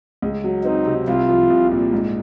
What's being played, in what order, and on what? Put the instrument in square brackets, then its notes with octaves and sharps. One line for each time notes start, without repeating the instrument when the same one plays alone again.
[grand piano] C#2
F#3
[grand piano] C4 [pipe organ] D#4
[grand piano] C3
[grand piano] C2 [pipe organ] F4
[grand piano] F3
C2
A#2
G#2